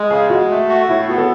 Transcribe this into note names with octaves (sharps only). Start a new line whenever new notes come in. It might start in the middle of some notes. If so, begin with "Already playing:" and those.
Already playing: G#3
C#3 G#4
G#3 F#4
A3
F#4
A2 E4
B3 F#4
A4